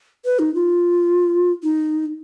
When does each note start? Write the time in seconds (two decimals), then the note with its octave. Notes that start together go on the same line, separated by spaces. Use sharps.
0.25 B4
0.39 D#4
0.55 F4
1.63 D#4